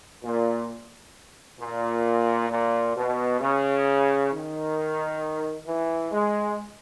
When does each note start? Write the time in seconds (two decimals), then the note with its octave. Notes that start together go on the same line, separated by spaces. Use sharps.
0.24 A#2
1.59 A#2
2.49 A#2
2.96 B2
3.41 C#3
4.31 D#3
5.66 E3
6.12 G#3